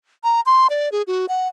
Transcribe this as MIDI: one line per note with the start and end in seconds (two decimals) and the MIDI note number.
0.24 0.41 82
0.46 0.67 84
0.70 0.89 74
0.92 1.02 68
1.07 1.26 66
1.29 1.48 78